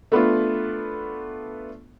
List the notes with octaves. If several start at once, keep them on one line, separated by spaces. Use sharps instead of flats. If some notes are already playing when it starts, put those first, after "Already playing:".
A3 B3 D4 F4